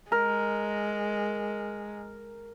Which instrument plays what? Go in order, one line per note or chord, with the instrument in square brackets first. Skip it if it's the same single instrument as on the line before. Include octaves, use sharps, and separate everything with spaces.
[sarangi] G#3 [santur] A#4